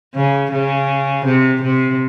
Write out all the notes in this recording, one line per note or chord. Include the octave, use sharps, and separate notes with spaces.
C#3
C#3
C3
C3